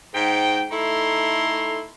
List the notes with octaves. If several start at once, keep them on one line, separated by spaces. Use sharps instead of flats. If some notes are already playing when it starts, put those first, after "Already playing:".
G#2 G5
A3 D#4 E4 A4 A#5 C6